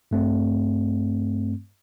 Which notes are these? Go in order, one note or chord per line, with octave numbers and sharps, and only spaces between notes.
G2 A3 C4